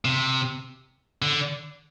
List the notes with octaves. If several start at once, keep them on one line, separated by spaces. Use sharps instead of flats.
C3
D3